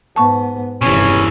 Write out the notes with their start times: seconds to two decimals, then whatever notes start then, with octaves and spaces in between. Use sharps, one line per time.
0.16 G#2 B3 A5 C#6
0.82 F1 G2 B2 E3 C#4